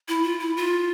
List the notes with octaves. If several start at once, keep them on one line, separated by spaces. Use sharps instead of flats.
E4
F4
E4
F4